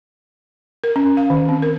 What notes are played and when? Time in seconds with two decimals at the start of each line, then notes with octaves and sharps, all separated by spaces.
0.84 A#4
0.96 C#4
1.17 F5
1.30 D#3
1.49 C4
1.62 A#4